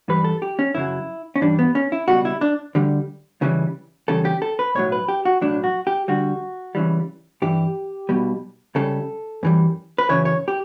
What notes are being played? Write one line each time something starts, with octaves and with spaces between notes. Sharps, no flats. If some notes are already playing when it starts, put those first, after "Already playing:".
G2 E3 G3 B4
A4
G4
C#4
F#2 C#3 F#3 E4
C#4
G2 E3 G3 D4
B3
C#4
E4
C#2 B2 G3 F#4
E4
D4
D2 D3 G3
C#2 C#3 E3 G3
E2 C#3 G3 A4
G4
A4
B4
B1 A2 F#3 C#5
B4
G4
F#4
B1 A2 F#3 D4
F#4
G4
D2 D3 G3 F#4
C#2 C#3 E3 G3
G2 E3 G3 G4
B1 B2 G3
C#2 C#3 G3 A4
F#2 E3 G3
B4
F#2 C#3 E3 C#5
C#5
G4